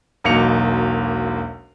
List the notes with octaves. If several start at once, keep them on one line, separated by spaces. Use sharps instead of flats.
E1 B1 A#3 C#7 F7